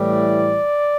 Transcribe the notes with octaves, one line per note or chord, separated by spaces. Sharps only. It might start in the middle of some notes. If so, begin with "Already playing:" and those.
Already playing: A2 E3 G3 D5